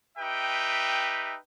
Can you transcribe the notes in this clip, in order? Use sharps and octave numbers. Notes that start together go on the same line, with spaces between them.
D#4 G4 B4 E5 G5